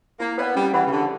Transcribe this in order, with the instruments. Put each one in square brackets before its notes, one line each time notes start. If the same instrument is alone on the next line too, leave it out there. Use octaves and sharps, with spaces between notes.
[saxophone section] A#3 [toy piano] E4
[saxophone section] B3 [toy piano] B4 D5 G5
[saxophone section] G3 [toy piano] C#4
[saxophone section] E3 [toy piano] G4 B4 F#5 B5
[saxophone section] C#3
[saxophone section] D3 [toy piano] G4